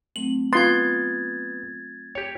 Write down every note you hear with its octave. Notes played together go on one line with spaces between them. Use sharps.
F#3 A3 C4 F#7
B3 F4 C6 G#6 A6
G4 C#5 G5